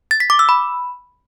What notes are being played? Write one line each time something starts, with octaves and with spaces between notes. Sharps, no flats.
A6
B6
D6
E6
B5